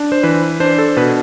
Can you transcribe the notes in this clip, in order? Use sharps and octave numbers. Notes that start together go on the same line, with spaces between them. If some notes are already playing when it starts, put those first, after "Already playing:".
Already playing: D4
C5
E3 B4
D4 C5
A4
B2 B4